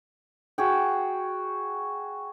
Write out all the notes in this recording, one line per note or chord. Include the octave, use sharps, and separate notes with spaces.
F#4 G#4 G5